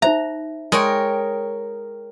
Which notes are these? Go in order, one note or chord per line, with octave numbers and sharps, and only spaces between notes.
D#4 C5 E5 A#5
G#3 A#4 C#5 G5